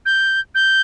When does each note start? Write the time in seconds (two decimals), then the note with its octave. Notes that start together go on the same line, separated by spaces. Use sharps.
0.06 G6
0.55 G6